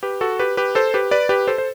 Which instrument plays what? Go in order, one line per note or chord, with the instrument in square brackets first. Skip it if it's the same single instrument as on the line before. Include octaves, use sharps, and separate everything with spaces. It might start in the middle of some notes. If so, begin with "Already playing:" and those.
[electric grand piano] G4 B4
F#4 A4
G4 B4
G4 B4
A4 C5
G4 B4
B4 D5
G4 B4
A4 C5
C5